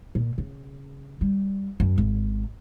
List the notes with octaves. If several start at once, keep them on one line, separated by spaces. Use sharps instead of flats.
A#2
C#3
G3
F#2
G#1